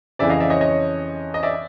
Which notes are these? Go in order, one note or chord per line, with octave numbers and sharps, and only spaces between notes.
F2 C#3 E3 D5 E5
D#5 F5
D5 E5
C#5 D#5
C#5 D#5
D#5
D5 E5